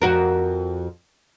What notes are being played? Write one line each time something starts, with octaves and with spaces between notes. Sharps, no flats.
F2 F#4 A#4